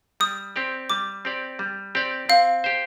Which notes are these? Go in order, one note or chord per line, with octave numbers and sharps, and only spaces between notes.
G3 D#6
C4 G4 D5
G3 D6
C4 G4 D5
G3
C4 G4 D5
C4 F5
G4 C5